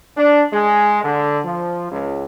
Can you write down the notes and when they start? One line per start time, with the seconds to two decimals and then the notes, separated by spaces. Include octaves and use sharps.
0.18 D4
0.53 G#3
1.04 D3
1.46 F3
1.91 C#2